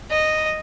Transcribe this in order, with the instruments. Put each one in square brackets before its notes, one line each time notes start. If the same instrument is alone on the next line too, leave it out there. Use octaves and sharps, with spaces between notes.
[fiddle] D#5